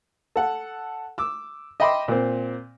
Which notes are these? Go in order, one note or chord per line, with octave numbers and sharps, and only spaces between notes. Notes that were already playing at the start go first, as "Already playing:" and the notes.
A4 F#5
D6 E6
D#5 E5 G5 B5 C6 D6
A#2 C4